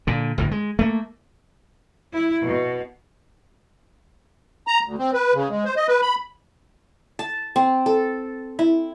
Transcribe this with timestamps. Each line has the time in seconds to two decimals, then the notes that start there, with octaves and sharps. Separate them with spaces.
0.07 A#2 D3
0.38 G1 D2 A2
0.51 G#3
0.79 A3 A#3
2.12 E4
2.43 B2
4.67 A#5
4.85 D2
4.98 C4
5.13 B4
5.34 C#3
5.50 G#3
5.65 C5
5.76 D#5
5.88 B4
6.02 B5
7.19 A5
7.56 C4
7.86 A4
8.59 E4